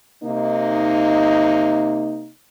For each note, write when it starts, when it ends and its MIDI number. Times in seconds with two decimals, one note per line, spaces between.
0.23 2.29 48
0.23 2.29 58
0.23 2.29 63